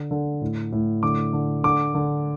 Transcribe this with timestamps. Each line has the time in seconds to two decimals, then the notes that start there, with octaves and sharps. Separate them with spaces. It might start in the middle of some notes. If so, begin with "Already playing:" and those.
Already playing: D3
0.11 D3
0.41 A2
0.72 A2
1.03 D3 D6
1.33 D3
1.64 D3 D6
1.95 D3